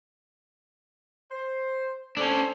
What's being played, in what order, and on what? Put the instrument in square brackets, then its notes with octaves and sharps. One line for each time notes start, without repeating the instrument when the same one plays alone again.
[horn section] C5
[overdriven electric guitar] C#4 D4 [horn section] A4 C5